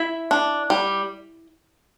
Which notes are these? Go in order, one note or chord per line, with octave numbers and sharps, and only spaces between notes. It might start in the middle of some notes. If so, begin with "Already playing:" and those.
Already playing: E4 E5
D4
G3